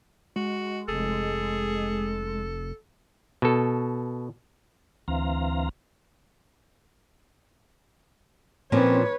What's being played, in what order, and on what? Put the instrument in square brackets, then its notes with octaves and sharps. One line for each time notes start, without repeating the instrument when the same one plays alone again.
[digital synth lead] G#3 [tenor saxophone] F#4
[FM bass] F1 [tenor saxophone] G#4 [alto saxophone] A4
[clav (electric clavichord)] B2 A4
[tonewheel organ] D2 E3 C4 F5 A#5
[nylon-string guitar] A#2 F3 C#4 [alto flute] C4 [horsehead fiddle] B4 C#5